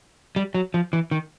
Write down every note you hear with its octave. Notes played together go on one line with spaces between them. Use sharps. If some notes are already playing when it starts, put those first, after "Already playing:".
G3
F#3
F3
E3
D#3